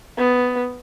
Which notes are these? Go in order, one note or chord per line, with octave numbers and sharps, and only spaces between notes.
B3